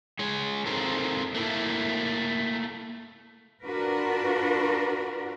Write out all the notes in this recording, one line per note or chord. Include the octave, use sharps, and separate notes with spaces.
G#3 C#5
C4 D#4 F4 A4 A#4
A3 A#3 E4
D4 F4 F#4 A#4 B4